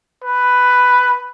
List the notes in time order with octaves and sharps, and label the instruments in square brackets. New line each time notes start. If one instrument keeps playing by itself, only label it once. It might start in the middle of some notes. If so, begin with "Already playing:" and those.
[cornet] B4